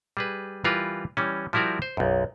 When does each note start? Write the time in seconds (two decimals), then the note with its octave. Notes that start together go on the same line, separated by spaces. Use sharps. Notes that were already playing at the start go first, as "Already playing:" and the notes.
0.17 G3 G#4 B4
0.64 E3 G3 F4 A#4 B4
1.17 E3 G3 C#4
1.53 F3 G3 E4 F#4 A#4 D5
1.82 C5
1.97 B1 F#2